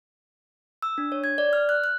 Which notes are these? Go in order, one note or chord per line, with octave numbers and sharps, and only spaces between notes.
E6
D4
C#5
G#6
D5
F6
F#6
F#6